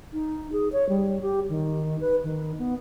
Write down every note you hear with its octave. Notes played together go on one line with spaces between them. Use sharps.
D#4
G#4
C#5
G3
G4
D#3
B4
D#3
B3